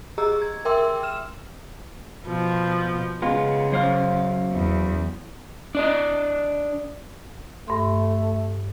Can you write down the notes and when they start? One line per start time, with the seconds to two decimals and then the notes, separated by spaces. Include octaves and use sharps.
0.18 G4 G#4 D#5 A#5 E6
0.42 G#6
0.65 A#4 E5 G5 C6 D6 E6
1.03 F6 E7
2.25 B2 F3
3.22 C#3 G#3 B3 F4
3.72 F#2 C5 F5
4.52 E2
5.75 D4 D5 D#5
7.68 G2 A3 C6